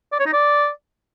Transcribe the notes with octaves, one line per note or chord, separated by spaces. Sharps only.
D5
C#5
D#4
D5